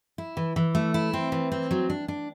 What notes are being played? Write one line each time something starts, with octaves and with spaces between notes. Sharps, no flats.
E4
E3
E3
A3
E4
C4
E3
C4
F#3
D4
D4